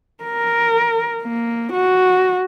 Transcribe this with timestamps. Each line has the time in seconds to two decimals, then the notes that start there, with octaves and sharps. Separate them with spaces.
0.24 A#4
1.23 A#3
1.72 F#4